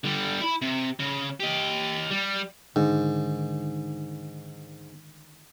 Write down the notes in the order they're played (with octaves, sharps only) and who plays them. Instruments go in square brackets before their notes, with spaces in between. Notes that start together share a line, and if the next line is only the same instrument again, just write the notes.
[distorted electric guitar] D3 G3
E4 B5
C3
C#3
G4 D#5
G3
[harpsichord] G#2 [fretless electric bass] D3 D#3 G#3